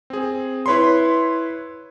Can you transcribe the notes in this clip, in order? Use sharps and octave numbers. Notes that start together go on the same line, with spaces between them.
C4 G#4
E4 B4 C#5 B5 C6